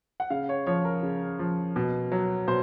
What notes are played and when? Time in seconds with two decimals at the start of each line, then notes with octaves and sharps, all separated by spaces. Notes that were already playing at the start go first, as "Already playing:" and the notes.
0.20 F#5
0.30 C#3 F5
0.49 C#5
0.67 F3 C#5
0.85 A#4
1.03 C#3
1.39 F3
1.76 B2
2.12 F#3
2.48 B2 C5